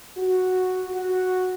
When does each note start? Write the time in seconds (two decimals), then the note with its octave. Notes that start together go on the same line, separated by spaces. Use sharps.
0.18 F#4
0.93 F#4